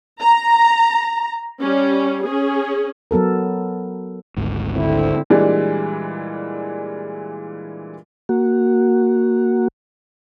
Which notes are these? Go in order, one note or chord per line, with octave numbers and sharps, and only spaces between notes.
A#5
G3 C#4
C#4 G#4
F#3 B3 A4 A#4
G#1 D2 G#2
D3 C4 E4
A#2 E3 G3 G#3 D4
A#3 F#4